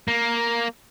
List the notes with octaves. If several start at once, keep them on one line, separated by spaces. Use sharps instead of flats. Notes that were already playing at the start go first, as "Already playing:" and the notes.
A#3